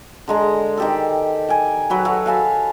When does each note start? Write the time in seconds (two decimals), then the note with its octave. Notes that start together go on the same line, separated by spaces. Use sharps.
0.28 D3 G#3 A#5
0.77 D#3 G4 A4
1.49 G5 G#5
1.90 F#3 B4 F#5
2.05 F#4 A4 C#5
2.26 F5 G#5 A5 B5